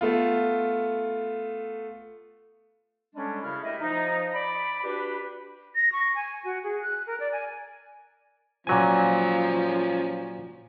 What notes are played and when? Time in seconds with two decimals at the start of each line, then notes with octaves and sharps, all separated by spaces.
0.01 A3 B3 F4
3.14 D3 G3 G#3 C#4 D4
3.43 F#2 C#3 E4 F6
3.62 G3 A3 E4 D#5 E5
3.80 F3 D#4
4.33 D5 B5
4.83 D4 F#4 G4 B4
5.75 A#6
5.92 C#6
6.15 G#5
6.45 F#4
6.63 G#4
6.82 F#6
7.07 A#4
7.20 D5
7.32 G#5
8.67 A#2 F3 F#3 C#4 G#5